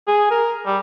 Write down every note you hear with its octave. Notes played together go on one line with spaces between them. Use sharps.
G#4
A#4
G3